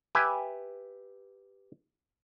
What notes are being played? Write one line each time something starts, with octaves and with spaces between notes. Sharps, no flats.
G4 B4 E5 G#5